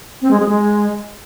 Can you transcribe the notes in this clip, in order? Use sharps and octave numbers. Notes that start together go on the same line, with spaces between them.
C4
G#3
G#4
G#3